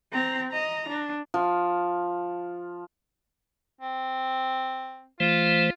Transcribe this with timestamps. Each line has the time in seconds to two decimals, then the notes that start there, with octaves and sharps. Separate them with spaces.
0.13 C4 A#5
0.51 D#5 A#5
0.89 D4
1.34 F3
3.81 C4
5.20 E3 A3 F4 C5